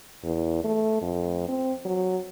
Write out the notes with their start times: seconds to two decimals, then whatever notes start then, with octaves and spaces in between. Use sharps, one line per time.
0.24 E2
0.64 A3
1.02 F2
1.49 C4
1.85 F#3